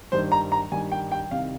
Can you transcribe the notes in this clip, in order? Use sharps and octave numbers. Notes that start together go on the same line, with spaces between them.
G2 D#3 G3 C5
A#5
A#5
G2 D#3 G3 G#5
G5
G5
C2 C3 D#3 G3 F5